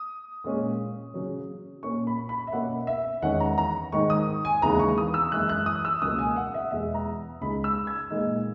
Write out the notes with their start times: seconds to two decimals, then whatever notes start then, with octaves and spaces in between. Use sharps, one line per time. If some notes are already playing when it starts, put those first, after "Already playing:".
Already playing: D#6
0.44 A#2 G#3 C#4
1.14 C#3 F#3 C#4
1.83 A#2 A#3 C#4 C#6
2.07 B5
2.29 B5
2.47 E5
2.53 B2 A#3 C#4 F#5
2.87 E5
3.22 E2 D#3 G#3 C#4 F#5
3.40 A#5
3.58 A#5
3.92 G#2 D#3 G#3 C#6
4.10 D#6
4.45 G#5
4.62 D#2 C#3 E3 G#3 B3 A#5
4.80 C#6
4.98 D#6
5.14 E6
5.32 F#2 E3 G#3 F#6
5.49 F#6
5.66 D#6
5.85 E6
6.02 C#2 B2 F#3 A#3 D#6
6.19 G#5
6.36 F#5
6.54 E5
6.71 E2 B2 G#3 E5
6.94 A#5
7.41 C#2 C#3 G#3 D#4 B5
7.64 E6
7.87 G#6
8.10 A#2 G#3 B3 D#4